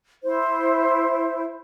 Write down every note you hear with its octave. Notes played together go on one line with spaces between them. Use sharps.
E4 C5